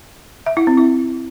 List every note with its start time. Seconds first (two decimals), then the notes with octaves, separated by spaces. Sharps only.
0.46 E5
0.57 E4
0.67 C4
0.77 E4